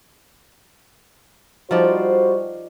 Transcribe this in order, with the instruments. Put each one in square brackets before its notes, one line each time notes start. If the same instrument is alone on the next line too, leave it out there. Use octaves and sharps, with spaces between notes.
[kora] F3 D#4 D5 [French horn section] G3 F#4 C5